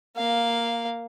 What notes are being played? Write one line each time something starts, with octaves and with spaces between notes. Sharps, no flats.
A#3 F5